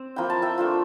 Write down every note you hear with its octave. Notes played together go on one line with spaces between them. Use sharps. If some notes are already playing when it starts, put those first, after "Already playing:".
Already playing: C4
F3 A#3 E4 G5
A5
E5 G5
A3 D4 F4